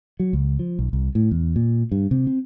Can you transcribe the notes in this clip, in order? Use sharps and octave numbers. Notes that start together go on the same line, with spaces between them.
F#3
C#2
F3
B1
C2
A2
E2
A#2
G2
C3
C4